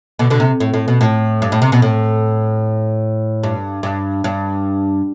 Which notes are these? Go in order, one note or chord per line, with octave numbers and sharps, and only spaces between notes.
B2 D3
B2 D3
C3
A2
A2
B2
A2
G2
A2
C3
B2
A2
G2
G2
G2